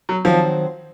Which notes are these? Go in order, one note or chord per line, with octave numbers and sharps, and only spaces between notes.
F#3
D#3 F3 F#3 C4 F#4 C5